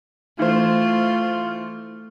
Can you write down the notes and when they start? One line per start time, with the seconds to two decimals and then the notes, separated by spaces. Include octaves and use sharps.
0.39 E3 A3 F4 C5